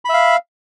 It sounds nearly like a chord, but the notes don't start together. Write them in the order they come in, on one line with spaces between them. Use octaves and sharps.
B5 E5 F5